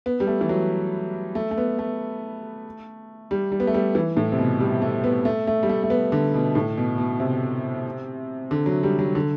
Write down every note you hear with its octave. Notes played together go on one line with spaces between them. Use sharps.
B3
G3
A3
E3
F#3
A3
A3
B3
A3
G3
G3
B3
A3
G3
E3
A2
C3
B2
G3
A3
B3
A3
A3
G3
A3
A3
B3
D3
B2
A2
B2
B2
C3
D3
F#3
G3
F#3
D3